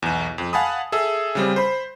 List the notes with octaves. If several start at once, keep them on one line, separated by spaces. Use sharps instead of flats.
B1 E2
F2
F5 F#5 G#5 A5 B5 D#6
G#4 A4 E5 E6
C#3 G3 C4
C5 B5